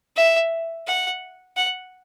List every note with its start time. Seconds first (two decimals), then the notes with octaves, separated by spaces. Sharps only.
0.16 E5
0.87 F#5
1.57 F#5